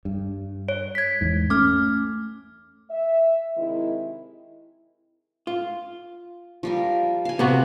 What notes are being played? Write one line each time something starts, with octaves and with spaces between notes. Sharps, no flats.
G2
C#5
G#6 B6
E2 G#2
A3 C#4 D6 F6
E5
C3 D#3 G#3 C4 E4
F4
F3 G3 A#4
F5 G#5
C3 B3 F#4